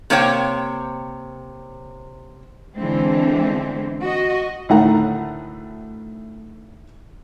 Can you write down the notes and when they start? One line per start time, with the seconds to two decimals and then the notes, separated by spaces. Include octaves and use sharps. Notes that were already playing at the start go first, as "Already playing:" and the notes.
0.10 C3 A#3 C5 C#5 G5
2.77 D3 E3 G#3 C4
4.03 F#4 D#5
4.69 D2 A2 D#3 A3 F#5 A#5